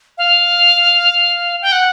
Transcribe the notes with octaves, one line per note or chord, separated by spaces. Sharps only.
F5
G5
F#5